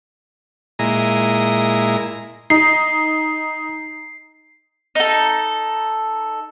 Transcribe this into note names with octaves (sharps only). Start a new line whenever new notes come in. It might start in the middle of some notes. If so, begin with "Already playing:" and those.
A#2 G#3 E4 D#5 A#5
D#4 C7
D#4 A4